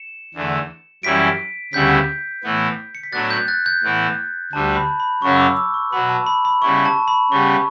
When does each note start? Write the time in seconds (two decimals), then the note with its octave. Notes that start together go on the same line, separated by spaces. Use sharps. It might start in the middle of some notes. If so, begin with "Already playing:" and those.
Already playing: C#7 E7
0.34 E2 D3 A3
1.03 F#2 E3 G3 C#4 E4 B6 D7
1.73 D2 C#3 G3 B3 E4 G6 B6
2.44 A2 E3 B3
2.95 C#7
3.03 B6
3.13 A2 F#3 B3 D4 F#6 A6
3.30 G6
3.48 F#6 A6
3.66 G6
3.83 A2 E3 B3 E4
4.53 D2 D3 G3 A5
4.76 B5
5.00 B5
5.22 F#2 C#3 F#3 C#4 C#6
5.36 E6
5.40 D6
5.57 E6
5.74 C#6
5.92 B2 F#3 B3 B5
6.09 A5
6.27 B5
6.45 B5
6.62 C#3 G3 B3 E4 C#6
6.86 A5
7.08 B5
7.31 C#3 G3 B3 C#6